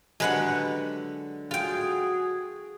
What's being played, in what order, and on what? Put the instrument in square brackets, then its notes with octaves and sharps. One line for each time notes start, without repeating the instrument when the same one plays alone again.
[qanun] D3 F#3 G4 [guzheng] G#3 B4 F#5
[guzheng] F4 G5 [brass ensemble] F#4 G#4